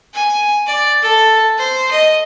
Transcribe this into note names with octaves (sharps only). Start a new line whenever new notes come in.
G#5
D5
A4
C5
D#5